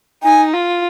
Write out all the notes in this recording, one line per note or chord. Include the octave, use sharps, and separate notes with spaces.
D#4 G#5
F4